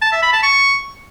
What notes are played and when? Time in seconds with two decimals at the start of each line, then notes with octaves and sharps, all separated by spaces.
0.02 A5
0.12 E5
0.22 B5
0.33 A5
0.43 C#6